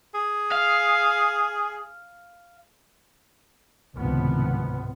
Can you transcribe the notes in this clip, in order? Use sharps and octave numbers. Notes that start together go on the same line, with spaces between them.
G#4
F5
G#1 C#2 A2 C3 F3 B3